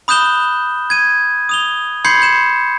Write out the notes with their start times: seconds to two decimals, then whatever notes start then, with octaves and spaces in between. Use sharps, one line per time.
0.08 B5 D#6 F#6 G6 E7 G7
0.90 G#6 D#7
1.49 D#6 F7 G7
2.05 B5 C6 G6 G#6 C7 C#7
2.22 G6 E7